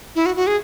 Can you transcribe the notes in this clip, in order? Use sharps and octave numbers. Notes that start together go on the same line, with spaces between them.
E4
F#4
F#4
G#4